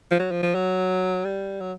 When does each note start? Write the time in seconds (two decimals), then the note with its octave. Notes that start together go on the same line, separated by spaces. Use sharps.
0.11 F3
0.19 F#3
0.31 F3
0.43 F3
0.55 F#3
1.24 G3
1.60 F#3